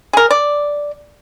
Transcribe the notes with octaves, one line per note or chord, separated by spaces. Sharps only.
G#4 A#4
D5